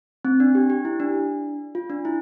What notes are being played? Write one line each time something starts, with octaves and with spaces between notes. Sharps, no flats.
C4
D4
G4
G4
E4
D4
F4
D4
E4